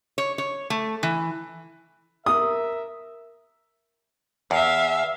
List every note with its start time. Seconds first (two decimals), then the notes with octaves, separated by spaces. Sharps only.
0.18 C#5
0.38 C#5
0.70 A3
1.03 E3
2.26 A#4 E5 D#6
4.51 E2 E5 F5